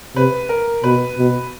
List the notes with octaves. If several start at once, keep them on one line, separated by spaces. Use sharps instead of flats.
C3 B4
A#4
B2 B4
B2